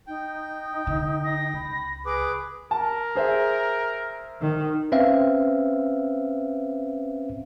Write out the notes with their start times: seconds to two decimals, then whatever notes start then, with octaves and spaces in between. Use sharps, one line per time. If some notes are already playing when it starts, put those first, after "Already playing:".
0.07 D#4 G5
0.87 D3
1.25 A#6
1.53 C#2 B5
2.05 G#4 B4 D6
2.71 A#4 A5
3.15 G#4 C5 E5
4.41 D#3
4.92 C4 C#4 B4 E5 F5